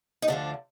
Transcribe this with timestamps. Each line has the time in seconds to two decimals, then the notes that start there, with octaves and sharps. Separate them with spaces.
0.22 D#4
0.28 D2 D3 F3 D4